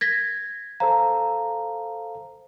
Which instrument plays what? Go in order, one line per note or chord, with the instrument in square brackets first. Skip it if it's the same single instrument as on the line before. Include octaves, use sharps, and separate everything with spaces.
[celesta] G#6 A#6 B6
[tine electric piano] A4 C5 F5 [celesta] A#5